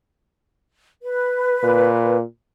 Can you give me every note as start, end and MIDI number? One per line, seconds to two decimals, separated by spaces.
1.02 2.17 71
1.63 2.22 46